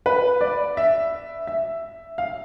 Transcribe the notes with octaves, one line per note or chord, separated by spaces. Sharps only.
B4
D5
E5
E5
F5